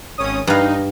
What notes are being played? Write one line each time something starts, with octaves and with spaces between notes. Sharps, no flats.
G#1 C#4 D#6
G2 D#4 F5